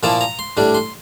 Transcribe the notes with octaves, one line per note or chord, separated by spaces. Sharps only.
A#2 F3 A#3 E4 A5
A#5
C6
A2 G3 D4
C6